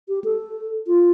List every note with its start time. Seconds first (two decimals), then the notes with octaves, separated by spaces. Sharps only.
0.09 G4
0.24 A4
0.87 F4